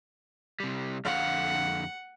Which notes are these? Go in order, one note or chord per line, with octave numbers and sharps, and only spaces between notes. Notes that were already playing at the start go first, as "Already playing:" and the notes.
C3 G3
F2 D3 F5 F#5